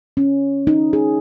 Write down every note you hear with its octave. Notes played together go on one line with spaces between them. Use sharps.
C#4
D#4
G#4